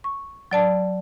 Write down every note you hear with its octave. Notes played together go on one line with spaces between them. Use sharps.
C#6
F#3 D5 A5